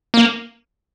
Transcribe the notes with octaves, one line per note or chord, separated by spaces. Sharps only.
A#3